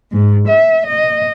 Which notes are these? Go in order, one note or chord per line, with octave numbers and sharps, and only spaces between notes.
G#2
E5
D#5